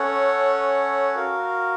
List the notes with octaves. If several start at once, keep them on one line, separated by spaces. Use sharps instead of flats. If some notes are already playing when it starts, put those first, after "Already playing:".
Already playing: C#4 A4 C#5 F#5
F#4 A#4 F5